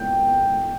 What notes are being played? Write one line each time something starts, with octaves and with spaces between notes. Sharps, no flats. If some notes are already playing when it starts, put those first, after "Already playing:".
Already playing: G5